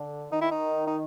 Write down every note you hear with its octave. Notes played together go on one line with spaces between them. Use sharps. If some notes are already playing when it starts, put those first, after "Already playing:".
Already playing: D3
D#3 D#4
E4
D#4
D#4